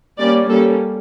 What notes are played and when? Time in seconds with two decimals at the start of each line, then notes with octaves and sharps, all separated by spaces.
0.19 G3 A#3 C#4 D5
0.49 G3 A#3 C#4 A4